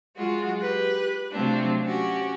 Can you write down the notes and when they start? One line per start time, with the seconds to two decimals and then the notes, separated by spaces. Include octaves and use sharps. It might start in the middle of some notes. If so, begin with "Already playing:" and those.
0.16 F#3 G#3 F4 F#4
0.59 G4 B4 F#6
1.31 C3 F#3 A3 C4 D4 F4
1.84 C#4 F#4 G4